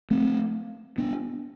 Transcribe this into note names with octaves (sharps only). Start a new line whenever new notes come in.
A3 C4
B3 D4